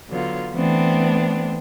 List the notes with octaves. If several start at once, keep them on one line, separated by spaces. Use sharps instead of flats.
D3 F#3 B3 F4
E3 A3 B3 C4 D4